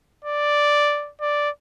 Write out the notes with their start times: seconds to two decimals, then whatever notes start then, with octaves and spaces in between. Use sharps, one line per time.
0.24 D5
1.21 D5